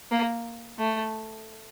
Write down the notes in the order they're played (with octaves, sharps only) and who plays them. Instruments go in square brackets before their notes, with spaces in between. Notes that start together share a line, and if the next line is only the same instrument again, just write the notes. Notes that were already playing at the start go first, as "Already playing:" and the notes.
[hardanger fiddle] A#3
A3